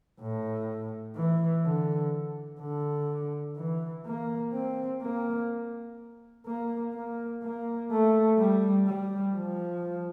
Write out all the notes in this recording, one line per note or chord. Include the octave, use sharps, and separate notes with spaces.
A2
E3
D3
D3
E3
A#3
C4
A#3
A#3
A#3
A#3
A3
G3
G3
F3